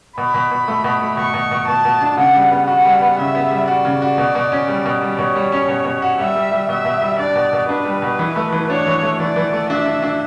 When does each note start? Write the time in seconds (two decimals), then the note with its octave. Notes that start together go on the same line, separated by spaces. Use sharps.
0.18 B2 B5
0.34 B2
0.51 B2
0.68 A3
0.84 B2
1.01 A3
1.17 B2 C#6
1.34 B2
1.51 B2
1.67 B2 A5
1.85 B2
2.01 D4
2.17 C#3 F#5
2.34 G3
2.51 B3
2.67 F#4 F#5
2.85 G3
3.01 B3
3.18 C#3 E5
3.35 B3
3.51 G3
3.68 F#4 D5
3.85 C#3
4.02 F#4
4.18 B2
4.35 B2
4.52 C#4
4.68 G3
4.86 B2
5.02 G3
5.18 B2 C#5
5.36 G3
5.52 C#4
5.68 B2
5.85 B2
6.02 F#4
6.19 G3 E5
6.36 G3
6.52 G3
6.69 B2 E5
6.85 B2
7.02 G3
7.19 D4 D5
7.36 B2
7.53 B2
7.69 D4 B4
7.85 G3
8.02 B2
8.19 E3
8.36 A3
8.52 E3
8.70 D4 C#5
8.87 E3
9.02 A3
9.20 E3 D5
9.36 E3
9.53 A3
9.69 D4 E5
9.86 D4
10.02 D4